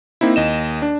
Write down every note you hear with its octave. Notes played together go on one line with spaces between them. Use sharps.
A#3 C4 D#4 E4
D#2 D#5 E7
D4